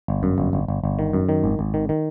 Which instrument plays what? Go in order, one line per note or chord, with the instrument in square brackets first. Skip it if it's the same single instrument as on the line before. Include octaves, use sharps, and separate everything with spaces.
[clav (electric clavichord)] G1
F#2
G1
G1
G1
G1
D#3
F#2
D#3
G#1
G#1
D#3
D#3